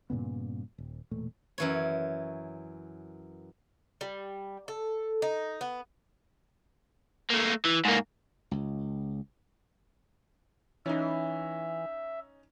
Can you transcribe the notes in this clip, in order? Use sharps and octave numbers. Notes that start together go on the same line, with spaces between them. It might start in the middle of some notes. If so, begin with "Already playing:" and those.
G2 A#2 C#3 B3
D#1
E1 A#2 A3
F#2 E3 C#5
G3
A4
D#4
B3
A3 A#3
E3
G#2 A#3
C#2
E3 C#4 D#4 E5